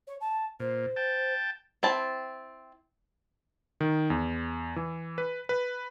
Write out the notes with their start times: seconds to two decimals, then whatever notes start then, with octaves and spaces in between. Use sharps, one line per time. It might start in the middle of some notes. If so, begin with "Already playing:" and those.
0.07 C#5
0.21 A5
0.60 A#2 C5
0.96 G5 A5
1.83 C4 E4 A5
3.81 D#3
4.10 E2
4.76 E3
5.18 B4
5.49 B4